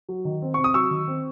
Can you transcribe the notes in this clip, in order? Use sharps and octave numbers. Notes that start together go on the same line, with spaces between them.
F#3
D#3
C4
C3 C#6
D#6
F#3 C#6 E6
D#3
C4